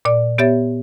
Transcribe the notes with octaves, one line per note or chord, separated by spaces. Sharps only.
A#2 D5
B3 G4 C#5 E5 A6